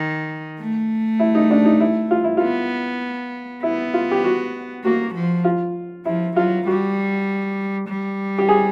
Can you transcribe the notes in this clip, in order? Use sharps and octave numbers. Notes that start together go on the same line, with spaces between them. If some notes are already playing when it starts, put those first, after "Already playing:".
Already playing: D#3
A3
E4
D#4
D4
D#4
E4
F4
E4
B3 F4
B3 E4
F4
G4
F#4
A#3 F#4
F3
F4
F3 E4
F#3 F4
G3 F#4
G3
G4
G#4